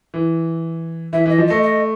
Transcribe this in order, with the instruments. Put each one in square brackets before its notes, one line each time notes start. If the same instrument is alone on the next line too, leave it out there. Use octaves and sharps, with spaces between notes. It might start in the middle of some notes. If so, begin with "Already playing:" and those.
[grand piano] E3
[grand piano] E3 [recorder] E5
[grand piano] E3 [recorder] D#5
[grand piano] F3
[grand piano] A3 [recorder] D#5
[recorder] D#5